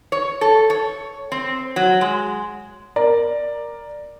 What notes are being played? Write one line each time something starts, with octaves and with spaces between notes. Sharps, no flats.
C#5
A4
C#5
C4
F#3
G#3
A#4 D5 A#5